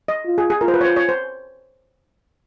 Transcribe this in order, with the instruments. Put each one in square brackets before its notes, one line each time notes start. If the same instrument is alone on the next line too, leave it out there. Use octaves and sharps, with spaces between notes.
[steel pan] D#5
[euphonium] F4
[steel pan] G#4
G#4
[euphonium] F4 [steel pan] A#4
[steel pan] C5
B4
C#5
C5
C#5
C5